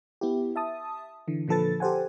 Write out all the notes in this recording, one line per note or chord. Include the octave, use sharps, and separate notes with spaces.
B3 E4 G4
E5 A5 D#6
D3 E3
A#2 D3 F3 A4 B4 A6
G4 A4 C5 F#5 G#5